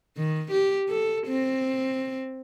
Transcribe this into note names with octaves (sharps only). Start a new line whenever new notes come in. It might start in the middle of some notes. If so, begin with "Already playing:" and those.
D#3
G4
A4
C4